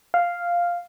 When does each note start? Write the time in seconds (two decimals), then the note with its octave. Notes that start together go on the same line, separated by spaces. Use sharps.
0.14 F5